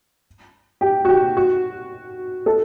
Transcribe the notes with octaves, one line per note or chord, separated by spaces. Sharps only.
G4
F#4
G4
F#4
A4